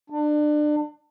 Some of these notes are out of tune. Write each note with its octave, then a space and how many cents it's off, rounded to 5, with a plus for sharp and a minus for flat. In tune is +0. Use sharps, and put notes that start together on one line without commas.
D4 +30